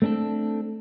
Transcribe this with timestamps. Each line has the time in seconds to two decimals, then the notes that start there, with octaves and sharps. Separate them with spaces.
0.02 A3 C4 D4 G#4 A4